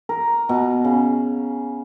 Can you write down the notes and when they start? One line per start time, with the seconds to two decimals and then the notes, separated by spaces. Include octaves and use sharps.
0.09 A#4
0.49 B2
0.84 C#3